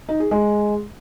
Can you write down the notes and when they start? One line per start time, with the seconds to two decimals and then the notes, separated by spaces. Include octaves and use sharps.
0.09 D#4
0.20 G#4
0.31 G#3